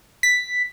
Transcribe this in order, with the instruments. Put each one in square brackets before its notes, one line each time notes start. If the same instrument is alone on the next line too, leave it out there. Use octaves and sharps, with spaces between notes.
[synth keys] B6